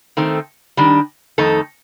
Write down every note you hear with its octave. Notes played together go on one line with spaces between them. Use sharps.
D#3 A3 C4
D#3 G3 D4
F2 D#3 A3 D#4 A4